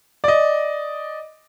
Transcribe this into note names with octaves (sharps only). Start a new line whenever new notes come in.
D5 D#5